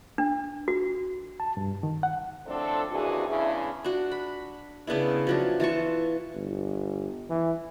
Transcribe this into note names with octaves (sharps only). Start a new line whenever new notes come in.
D4
F#4
A5
G2
D#3
F#5
A2 F3 C4 D4 A4
D#2 C3 E3 D4 F#4 G#4
E2 C#3 G#3 D4 E4
D4 F#4
B5
C#3 B3 D4 E4
F3 F#3 D4
E3 F4 A5 C#6
G1
E3